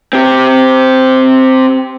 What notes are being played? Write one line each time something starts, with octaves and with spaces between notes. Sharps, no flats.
C4 G4